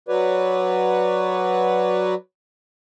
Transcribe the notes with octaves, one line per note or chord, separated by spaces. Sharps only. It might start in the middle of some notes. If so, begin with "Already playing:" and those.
F#3 F#4 B4 C#5 D5